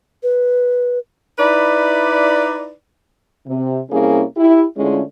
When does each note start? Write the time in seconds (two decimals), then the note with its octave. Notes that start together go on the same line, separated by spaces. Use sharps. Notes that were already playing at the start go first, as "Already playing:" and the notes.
0.23 B4
1.39 D#4 E4 B4 D5
3.46 C3
3.91 C3 G3 A#3 C#4 E4 G#4
4.36 E4 G4
4.77 D3 G#3 A3 C#4 E4 F4